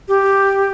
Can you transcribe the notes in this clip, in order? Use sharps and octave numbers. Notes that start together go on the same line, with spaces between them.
G4